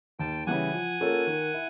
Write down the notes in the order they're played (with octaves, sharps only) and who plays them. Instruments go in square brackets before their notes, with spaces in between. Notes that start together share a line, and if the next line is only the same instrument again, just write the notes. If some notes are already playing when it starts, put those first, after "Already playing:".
[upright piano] D#2 [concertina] G5 A5
[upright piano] C#3 E3 G3 [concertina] F#5 G#5
[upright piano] F3
A#3 C#4 F4 A4
D#3
E4